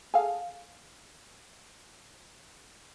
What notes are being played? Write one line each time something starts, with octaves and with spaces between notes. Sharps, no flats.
G#4 A4 F5